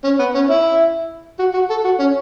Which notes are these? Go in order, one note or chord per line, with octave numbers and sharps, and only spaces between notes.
C#4
B3
C#4
E4
F#4
F#4
A4
F#4
C#4